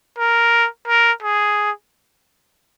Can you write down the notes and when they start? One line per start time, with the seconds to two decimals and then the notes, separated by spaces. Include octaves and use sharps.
0.18 A#4
0.88 A#4
1.22 G#4